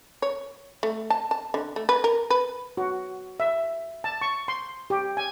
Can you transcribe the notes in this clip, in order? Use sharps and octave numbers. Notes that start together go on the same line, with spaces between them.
C#5
A3
A5
A5
D3
A3
B4
A#4
B4
F#4
E5
A5
C#6
C6
G4
G#5